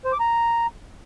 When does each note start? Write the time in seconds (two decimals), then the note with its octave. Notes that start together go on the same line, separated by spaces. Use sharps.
0.05 C5
0.12 D6
0.20 A#5